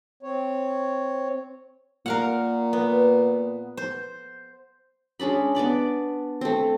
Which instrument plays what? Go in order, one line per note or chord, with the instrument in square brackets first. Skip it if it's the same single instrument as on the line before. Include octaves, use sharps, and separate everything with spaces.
[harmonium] C4 C#5
[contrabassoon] A#2 [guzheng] A#4 F5 F#5
[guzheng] B3
C5
[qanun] G#3 C#4 D4 B5
B3 D4 D5 B5
A3 C4